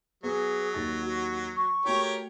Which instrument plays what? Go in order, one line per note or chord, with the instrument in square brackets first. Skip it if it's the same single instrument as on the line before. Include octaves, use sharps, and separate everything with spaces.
[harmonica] F#3 [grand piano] B3 [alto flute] G#4
[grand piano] D#2 A6
[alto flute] F#4
C#6
[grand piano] A3 F#4 [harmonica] G4 A#4 C#5